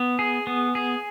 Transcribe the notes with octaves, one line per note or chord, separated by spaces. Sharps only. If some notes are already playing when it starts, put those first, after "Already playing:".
Already playing: B3
G#4
B3
G#4